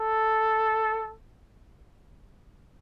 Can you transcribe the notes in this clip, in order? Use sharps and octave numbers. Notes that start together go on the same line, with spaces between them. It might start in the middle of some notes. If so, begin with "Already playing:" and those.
Already playing: A4